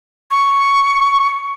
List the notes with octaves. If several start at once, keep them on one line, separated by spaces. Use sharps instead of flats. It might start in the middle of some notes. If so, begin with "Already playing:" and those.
C#6